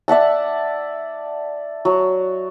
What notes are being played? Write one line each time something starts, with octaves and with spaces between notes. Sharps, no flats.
D5 E5 F#5 A5
F#3